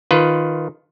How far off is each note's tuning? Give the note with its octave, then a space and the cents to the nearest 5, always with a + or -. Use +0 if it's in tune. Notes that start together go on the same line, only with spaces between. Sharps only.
D#3 +0 F4 +0 B4 +15